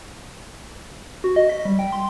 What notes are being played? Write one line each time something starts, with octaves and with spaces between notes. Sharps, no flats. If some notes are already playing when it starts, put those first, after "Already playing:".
F#4
D#5
B6
G3
G5
C6